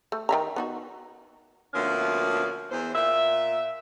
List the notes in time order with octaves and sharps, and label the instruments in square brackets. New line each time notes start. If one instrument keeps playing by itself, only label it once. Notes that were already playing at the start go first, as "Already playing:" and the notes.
[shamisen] A3
D#3 E5 A#5
B3 D#4 F#4
[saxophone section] D2 F3 A#3 B3 C#4
E2 C5
A#2 E5